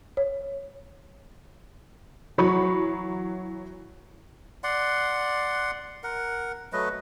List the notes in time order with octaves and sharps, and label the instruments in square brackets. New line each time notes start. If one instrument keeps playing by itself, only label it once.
[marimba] C#5
[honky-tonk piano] E3 F#3 B5 C#6
[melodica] D5 F#5 C6
A#4 F#5
F#3 A3 B4 D#5